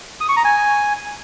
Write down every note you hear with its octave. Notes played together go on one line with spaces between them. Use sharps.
D#6
C#6
A#5
G#5